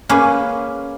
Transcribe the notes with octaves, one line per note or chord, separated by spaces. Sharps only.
A#3 C#4 G#4 B4